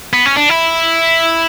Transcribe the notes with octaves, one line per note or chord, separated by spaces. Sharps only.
B3
C#4
D4
E4